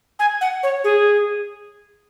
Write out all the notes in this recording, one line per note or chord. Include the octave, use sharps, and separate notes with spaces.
G#5
F#5
C#5
G#4